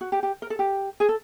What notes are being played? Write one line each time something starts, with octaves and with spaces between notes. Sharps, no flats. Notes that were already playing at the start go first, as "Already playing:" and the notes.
F#4
G4
G4
A#4
A4
G4
G#4
A4